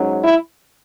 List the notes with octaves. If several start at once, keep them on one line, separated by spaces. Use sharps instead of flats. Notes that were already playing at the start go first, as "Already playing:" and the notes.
Already playing: G#2 F#3 C#4
E4